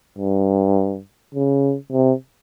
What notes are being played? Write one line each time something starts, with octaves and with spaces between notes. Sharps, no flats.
G2
C#3
C3